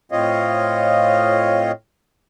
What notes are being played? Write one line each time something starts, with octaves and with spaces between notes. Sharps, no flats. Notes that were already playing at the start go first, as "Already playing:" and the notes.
A2 C4 F4 C#5 D#5 F5